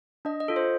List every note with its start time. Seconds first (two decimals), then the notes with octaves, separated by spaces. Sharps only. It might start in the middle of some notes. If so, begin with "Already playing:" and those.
0.25 D4 D#5
0.40 D#5
0.48 F4 A4
0.56 C5